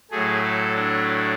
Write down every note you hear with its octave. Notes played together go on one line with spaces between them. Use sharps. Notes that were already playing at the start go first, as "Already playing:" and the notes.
A2 F#3 A3 G#4
A4
D4